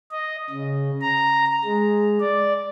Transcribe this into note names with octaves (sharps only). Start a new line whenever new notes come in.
D#5
C#3
A#5
G#3
D5